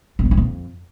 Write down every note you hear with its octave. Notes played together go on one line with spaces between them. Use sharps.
B2
F#2
A#2
F2